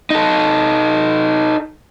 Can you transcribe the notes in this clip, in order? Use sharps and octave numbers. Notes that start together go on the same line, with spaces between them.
D#4 A4